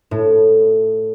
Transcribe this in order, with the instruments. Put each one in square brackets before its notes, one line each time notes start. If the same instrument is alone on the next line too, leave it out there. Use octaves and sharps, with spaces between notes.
[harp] A2